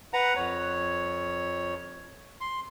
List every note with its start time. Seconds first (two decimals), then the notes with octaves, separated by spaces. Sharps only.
0.13 B4 F#5 A#5
0.36 F2 C#5
2.41 C6